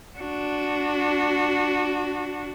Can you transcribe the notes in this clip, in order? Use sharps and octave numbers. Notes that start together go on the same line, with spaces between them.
D4 F#4